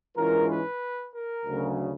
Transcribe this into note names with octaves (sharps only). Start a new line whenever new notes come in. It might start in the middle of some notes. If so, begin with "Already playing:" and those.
G#2 E3 G#3 C#4 F4 A#4
B4
A#4
D2 C#3 F#3